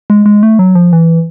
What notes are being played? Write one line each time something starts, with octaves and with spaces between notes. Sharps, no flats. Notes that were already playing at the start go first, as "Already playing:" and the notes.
G#3
G#3
A3
F#3
F3
E3